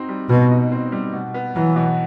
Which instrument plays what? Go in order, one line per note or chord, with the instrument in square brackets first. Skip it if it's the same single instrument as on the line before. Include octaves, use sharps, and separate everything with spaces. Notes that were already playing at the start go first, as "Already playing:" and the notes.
Already playing: [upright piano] C4 D#4 F#4
G3
[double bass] B2 [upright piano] F#4
[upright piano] D#4
C4
G3
B2
B3
[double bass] E3 [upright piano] F#3
[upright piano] B2